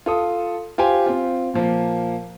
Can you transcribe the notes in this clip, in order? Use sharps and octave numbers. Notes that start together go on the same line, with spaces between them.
F4 A4 D#6
F4 G4 C5 G#5
C4 F4
A#2 F3 A#3